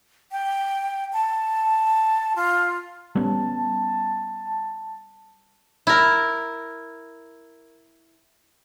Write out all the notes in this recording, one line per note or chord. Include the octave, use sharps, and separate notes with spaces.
G5
A5
F4
G3 B3 C#4 A5
E4 A#4